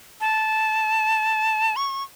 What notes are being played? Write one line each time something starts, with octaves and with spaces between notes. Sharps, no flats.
A5
C#6